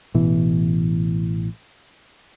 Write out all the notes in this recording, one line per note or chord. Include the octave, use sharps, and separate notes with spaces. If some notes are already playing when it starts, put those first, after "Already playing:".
A1 B2 E3